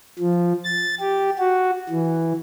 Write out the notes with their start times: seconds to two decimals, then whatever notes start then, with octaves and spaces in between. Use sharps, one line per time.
0.19 F3
0.64 A6
1.00 G4
1.38 F#4
1.89 E3